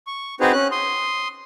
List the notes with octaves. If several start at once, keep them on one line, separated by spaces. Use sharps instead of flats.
C#6
C4 D#4 F#4 G#4 B4 C5
C#4 F#6
C6 D#6